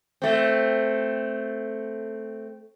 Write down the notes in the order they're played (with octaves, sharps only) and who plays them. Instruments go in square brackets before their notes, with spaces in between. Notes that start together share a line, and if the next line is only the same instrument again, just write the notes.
[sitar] A3 C4